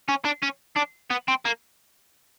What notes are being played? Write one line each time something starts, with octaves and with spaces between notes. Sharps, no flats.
C#4
D4
C#4
D4
B3
C4
A#3